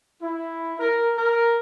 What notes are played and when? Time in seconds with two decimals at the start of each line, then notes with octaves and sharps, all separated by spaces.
0.21 E4
0.79 A#4
1.17 A#4